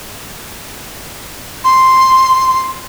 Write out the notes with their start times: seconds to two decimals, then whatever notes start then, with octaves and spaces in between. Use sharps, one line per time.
1.64 C6